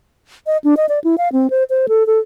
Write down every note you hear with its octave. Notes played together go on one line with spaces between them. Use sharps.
D#5
D4
D#5
D5
E4
F5
C4
C5
C5
A4
A4